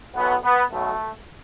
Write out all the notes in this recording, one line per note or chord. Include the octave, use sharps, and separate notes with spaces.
B1 A2 F#3 B3
B3
B1 B2 F#3 A3